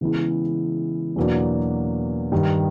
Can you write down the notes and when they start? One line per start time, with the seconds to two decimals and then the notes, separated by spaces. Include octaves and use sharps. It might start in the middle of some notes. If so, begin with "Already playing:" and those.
0.01 C#3 E3 G#3 B3 E4
1.16 E2 B2 F#3 A#3 D4
2.32 G2 D#3 G3